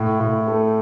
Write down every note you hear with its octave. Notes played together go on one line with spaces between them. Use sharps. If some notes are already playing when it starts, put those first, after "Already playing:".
Already playing: A2
A2
A3